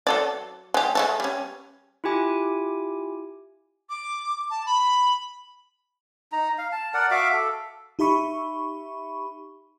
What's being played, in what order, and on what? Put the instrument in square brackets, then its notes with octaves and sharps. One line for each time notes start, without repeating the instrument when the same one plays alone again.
[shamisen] F#3 A4 D5
G#3 G4
G#3 A3 A4
G3 C#4
[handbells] E4 F4 G4 G#5 D6
[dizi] D6
A5
B5
[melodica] D#4 A#5
F5
A5
A#4 D5 F#5
F#4 E5 F5 D6
A4
[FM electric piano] D#4 G4 E5 B5 C#6